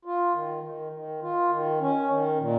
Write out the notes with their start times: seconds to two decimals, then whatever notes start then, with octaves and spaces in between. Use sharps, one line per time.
0.05 F4
0.34 D#3
0.64 D#3
0.92 D#3
1.22 F4
1.51 D#3
1.80 C#4
2.10 D#3
2.39 A#2